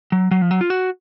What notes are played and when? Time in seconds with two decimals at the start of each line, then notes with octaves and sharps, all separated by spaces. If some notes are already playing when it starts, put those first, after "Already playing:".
0.12 F#3
0.31 F#3
0.42 F3
0.51 F#3
0.61 F4
0.70 F#4